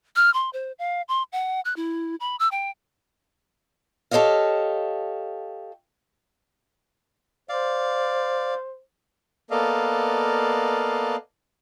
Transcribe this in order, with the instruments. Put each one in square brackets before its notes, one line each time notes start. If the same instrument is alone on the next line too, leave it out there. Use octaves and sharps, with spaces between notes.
[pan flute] F6
C6
C5
F5
C6
F#5
F#6
E4
B5
E6
G5
[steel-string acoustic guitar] G4 A4 C5 C#5 D#5 F5
[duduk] C5 [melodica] D5 F5
[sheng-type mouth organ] A#3 B3 A4 D5 D#5 F5